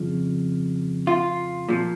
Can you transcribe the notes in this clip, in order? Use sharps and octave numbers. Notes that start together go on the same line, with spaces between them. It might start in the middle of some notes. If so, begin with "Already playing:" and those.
Already playing: F2 C#3 F3
F4
A#2 F3